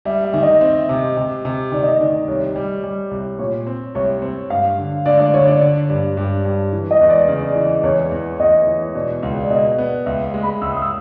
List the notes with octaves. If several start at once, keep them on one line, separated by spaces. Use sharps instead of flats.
G3 E5
E5
D#3
D#5
C4
C3
C3
C3
D#3 D5
D#5
D5
D#3
C2 C#5
G3
G3
C2
A#2 C#5
C4
C2 C#5
C4
G2 F5
D3
D3 D5
D5
D3 C#5
D5
D3
G2
G2
G2
E3
D#5
E2
D5
C#3
E3
E2 C#5
E2
E2 D#5
E3
B2 D5
C#2
D5
B2 D#5
B3
C#2 E5
G#3
B5
C#2 E6
D#6
E6